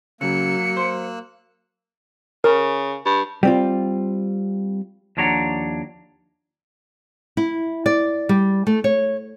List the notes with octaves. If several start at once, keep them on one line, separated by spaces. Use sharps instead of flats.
C#3 F#3 A#3 E6 F#6 C#7
C5
C#3 A#4
G2
G3 C4 F4
D#2 F3 D4 C#5 F#5 A#5
E4
D5
G3
A3
C#5